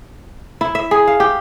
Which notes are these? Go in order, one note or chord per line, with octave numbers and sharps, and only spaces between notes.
E4
E5
G#4
F5
G4